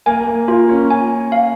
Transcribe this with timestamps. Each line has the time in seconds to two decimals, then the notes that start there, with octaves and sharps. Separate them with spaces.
0.06 A#3 G#5
0.27 A#3
0.48 A#3 F4
0.69 C#4
0.90 G#5
1.32 F5